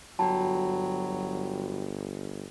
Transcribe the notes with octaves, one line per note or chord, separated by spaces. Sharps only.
G1 F#3 F#4 G5 A5 B5